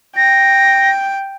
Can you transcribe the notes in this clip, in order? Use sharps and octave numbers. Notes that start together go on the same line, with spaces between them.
G5 A#6